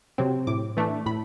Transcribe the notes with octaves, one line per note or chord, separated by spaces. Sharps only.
C3 F#3 C4
A2 D6
E3 A3 D4
A2 B5